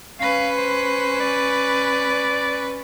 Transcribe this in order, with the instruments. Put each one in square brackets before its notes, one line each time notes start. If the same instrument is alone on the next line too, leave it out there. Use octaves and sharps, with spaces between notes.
[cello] C#4 B4 [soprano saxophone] F5
[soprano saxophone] C5
D5